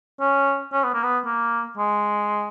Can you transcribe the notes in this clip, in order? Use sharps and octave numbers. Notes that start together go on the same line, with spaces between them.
C#4
C#4
B3
A#3
B3
A#3
G#3